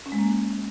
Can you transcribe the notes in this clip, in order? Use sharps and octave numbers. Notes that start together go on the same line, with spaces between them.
C#4
G#3
A#3